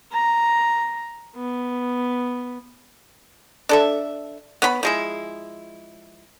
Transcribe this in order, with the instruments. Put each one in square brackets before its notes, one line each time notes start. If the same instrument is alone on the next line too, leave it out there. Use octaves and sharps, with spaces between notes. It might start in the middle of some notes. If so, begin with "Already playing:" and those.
[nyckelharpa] A#5
B3
[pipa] D4 A4 E5
B3 C#5 B5
F3 G#3 E4